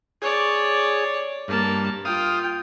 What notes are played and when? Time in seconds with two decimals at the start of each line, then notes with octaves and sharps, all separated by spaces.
0.22 G#4 C#5 D5
1.48 G2 A#3 A5
2.05 F4 F5 G5 D#6